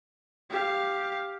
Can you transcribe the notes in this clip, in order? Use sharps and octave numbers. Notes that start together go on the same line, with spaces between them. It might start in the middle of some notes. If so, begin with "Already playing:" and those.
G4 F5